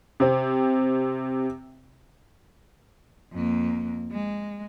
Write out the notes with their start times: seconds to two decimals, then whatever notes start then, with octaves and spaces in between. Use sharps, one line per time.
0.20 C3 C4
3.33 F2 A#3
4.12 G#3